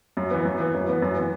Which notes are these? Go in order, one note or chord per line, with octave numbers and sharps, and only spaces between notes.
F#2
E3 B3
F#2
E3 B3
F#2
E3 B3
F#2
E3 B3